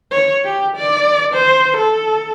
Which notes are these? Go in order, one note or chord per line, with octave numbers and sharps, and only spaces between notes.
C#5
G4
D5
C5
A4